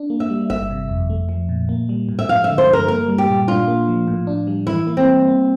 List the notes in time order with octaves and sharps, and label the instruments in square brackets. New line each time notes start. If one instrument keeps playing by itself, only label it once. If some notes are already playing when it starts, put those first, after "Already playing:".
Already playing: [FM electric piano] D4
A#3
[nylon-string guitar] E5
[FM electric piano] G3
[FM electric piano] G1 [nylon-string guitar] E5
[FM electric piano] C3
F2
A3
F3
A#2
A#3
G3
A2
[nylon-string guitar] E5
[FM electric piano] F3 [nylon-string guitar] F5
[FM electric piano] D3 [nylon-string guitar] E5
[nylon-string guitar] C5
[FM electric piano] G2 [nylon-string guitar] A#4
[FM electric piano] A#3 [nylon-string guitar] A#4
[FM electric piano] G3
[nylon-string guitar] G4
[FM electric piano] A#2
[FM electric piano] D4 [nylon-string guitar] F4
[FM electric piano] A#3
F3
A2
D4
G3
[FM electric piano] E3 [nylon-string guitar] E4
[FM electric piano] A#3
[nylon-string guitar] C4
[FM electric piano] G3
A#3